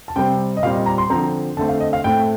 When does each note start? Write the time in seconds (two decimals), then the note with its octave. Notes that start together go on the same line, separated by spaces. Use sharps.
0.08 A5
0.16 C3 G3 C4 G5
0.57 D#5
0.63 A#2 G3 C4 F5
0.74 D#5
0.86 A#5
0.98 C6
1.10 D3 F3 C4 A#5
1.57 D3 A3 C4 A5
1.69 F5
1.80 D#5
1.93 F5
2.04 A2 A3 C4 G5